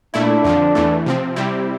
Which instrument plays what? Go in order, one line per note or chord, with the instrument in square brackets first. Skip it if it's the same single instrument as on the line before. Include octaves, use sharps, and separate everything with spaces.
[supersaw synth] A#2 A3 E4 [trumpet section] D4
[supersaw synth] F2 D3 F3
E2 E3 A3
C3 F3 C4
C3 G3 C4 E4 G4